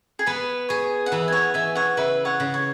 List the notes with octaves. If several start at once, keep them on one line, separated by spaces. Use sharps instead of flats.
G#4
B3 B4
G#4 C#5
F#5
E3 B4 E5
G#5
C#5 F#5
E3 E5 G#5
C#5 F#5
C#3 B4 E5
C#5 F#5
C#3
C#5